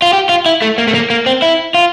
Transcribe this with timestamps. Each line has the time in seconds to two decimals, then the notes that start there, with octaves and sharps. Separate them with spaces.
0.02 F4
0.13 G4
0.29 F4
0.46 E4
0.62 A3
0.78 A#3
0.88 A3
0.94 A#3
1.10 A#3
1.26 C4
1.42 E4
1.74 F4